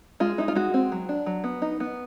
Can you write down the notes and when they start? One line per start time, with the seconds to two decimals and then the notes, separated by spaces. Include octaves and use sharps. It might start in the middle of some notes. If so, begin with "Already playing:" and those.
0.20 G#3 F4
0.38 D#4 E4
0.48 F4
0.55 G#3 F#4
0.74 C4
0.92 F#3
1.09 D4
1.26 F#3
1.44 B3
1.62 D#4
1.80 B3